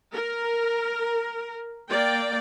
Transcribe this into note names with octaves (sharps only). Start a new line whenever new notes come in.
A#4
A#3 D5 G5